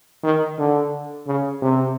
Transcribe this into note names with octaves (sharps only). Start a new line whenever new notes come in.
D#3
D3
C#3
C3